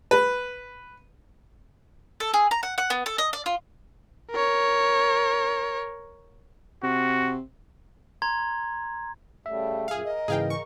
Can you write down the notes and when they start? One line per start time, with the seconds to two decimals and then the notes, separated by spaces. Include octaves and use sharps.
0.11 B4
2.20 A4
2.34 G#4
2.51 A#5
2.63 F#5
2.78 F#5
2.90 B3
3.06 A4
3.18 D#5
3.33 D5
3.46 F4
4.31 A#4 C#5
6.83 C3 F#4
8.22 A#5 C6 G#6
9.46 C#3 G3 A3 E5
9.88 F#2 A#2 G#4 F5
10.05 A#4 D#5
10.28 G#2 C#3 E3 G#4 F5 G5
10.50 C#6